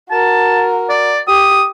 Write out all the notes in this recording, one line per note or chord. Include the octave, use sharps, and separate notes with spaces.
F#4 A#4 A5
D5
G4 D#6